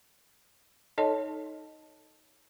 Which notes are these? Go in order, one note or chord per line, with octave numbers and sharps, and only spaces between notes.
D#4 A4 C#5 D#5 A5